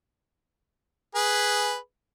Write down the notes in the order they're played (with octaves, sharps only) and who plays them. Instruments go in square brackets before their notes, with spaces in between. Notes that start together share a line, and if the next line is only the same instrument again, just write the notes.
[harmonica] G#4 B4